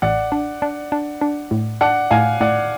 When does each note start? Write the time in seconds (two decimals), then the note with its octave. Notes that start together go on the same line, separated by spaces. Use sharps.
0.02 A1 D5 F#5
0.32 D4
0.62 D4
0.92 D4
1.21 D4
1.51 A2
1.81 D4 D5 F#5
2.11 A2 F5 G#5
2.41 A2 D5 F#5